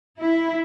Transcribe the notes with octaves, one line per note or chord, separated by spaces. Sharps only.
E4